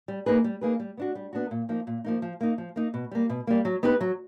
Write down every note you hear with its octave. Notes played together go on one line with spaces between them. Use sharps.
G3
A#3 D#4 G#4 B4
G3
A#3 D#4 G#4 B4
G3
B3 D4 F#4
G3
B3 D4 F#4
A#2
F3 A#3 D#4
A#2
F3 A#3 D#4
F3
A#3 D#4
F3
A#3 D#4
B2
G3 A#3
B2
G3 A#3
F#3
B3 D#4 G4 B4
F#3